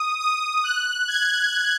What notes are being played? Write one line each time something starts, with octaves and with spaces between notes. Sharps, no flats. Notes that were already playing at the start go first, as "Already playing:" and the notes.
Already playing: D#6
D#6
F#6
G#6